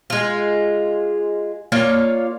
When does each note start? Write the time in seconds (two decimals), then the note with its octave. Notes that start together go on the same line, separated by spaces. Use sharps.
0.10 G#3 F4
1.72 A#3 F4 C#5 D5